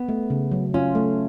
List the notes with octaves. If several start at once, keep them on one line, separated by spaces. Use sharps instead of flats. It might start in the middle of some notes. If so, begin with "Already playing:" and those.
Already playing: B3
A3
C#3
F#3
C#4 F4
A3